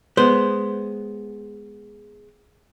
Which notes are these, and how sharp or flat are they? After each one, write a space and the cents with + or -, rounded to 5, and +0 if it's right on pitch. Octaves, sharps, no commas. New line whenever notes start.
G#3 +0 B3 +0 C5 +0